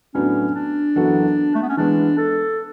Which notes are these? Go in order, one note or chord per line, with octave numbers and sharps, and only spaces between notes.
A2 F#3 B3 C#4 D4
D4
F#2 E3 B3 F#4 A4
A3
B3
C#4
E3 G#3 B3 D4
A4